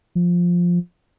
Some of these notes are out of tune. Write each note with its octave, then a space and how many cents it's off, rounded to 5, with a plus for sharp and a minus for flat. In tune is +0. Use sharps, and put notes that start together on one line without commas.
F3 +5